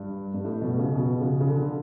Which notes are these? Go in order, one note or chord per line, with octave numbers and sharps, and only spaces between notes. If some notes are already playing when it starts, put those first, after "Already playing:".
Already playing: G2
G2
A2
B2
C#3
B2
C#3
C#3
D3
D3